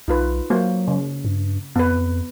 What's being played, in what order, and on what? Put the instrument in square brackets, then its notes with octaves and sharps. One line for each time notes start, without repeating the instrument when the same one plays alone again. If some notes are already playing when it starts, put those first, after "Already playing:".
[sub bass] B1 [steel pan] D#4 F4 B4
[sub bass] F#3 [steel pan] A#3 F#4 C5
[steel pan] C#3
[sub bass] G2
[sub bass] F2 [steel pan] B3 B4